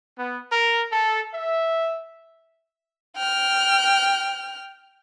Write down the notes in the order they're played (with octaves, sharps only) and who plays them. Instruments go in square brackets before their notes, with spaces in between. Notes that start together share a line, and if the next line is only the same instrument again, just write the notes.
[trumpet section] B3
A#4
A4
E5
[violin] G5 F6